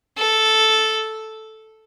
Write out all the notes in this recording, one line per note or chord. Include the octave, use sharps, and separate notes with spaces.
A4